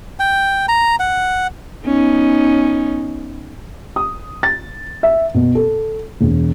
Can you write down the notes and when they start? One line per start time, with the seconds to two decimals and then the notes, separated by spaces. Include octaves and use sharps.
0.20 G5
0.68 A#5
0.99 F#5
1.85 B3 C#4 D#4
3.96 D#6
4.43 A6
5.03 E5
5.34 B2
5.55 A4
6.21 E1